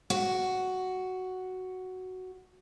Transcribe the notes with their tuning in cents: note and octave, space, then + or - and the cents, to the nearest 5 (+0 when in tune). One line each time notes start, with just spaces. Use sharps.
F#4 +5